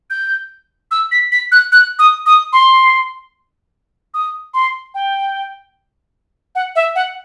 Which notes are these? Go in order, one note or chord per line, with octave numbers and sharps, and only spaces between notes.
G6
E6
B6
B6
F#6
F#6
D#6
D#6
C6
D#6
C6
G5
F#5
E5
F#5